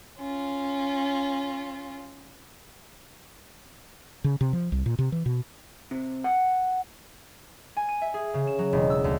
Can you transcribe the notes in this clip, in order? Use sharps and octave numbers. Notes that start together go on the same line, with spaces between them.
C#4 F4
C#3
C3
F3
C2
A#2
C3
E3
B2
C3
F#5
G#5
D#7
E5
G#4
C#3
E7
F#3
E1
E6
D2